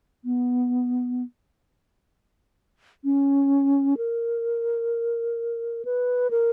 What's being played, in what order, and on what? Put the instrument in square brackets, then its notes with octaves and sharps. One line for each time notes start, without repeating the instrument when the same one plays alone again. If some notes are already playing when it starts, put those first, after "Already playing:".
[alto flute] B3
C#4
A#4
B4
A#4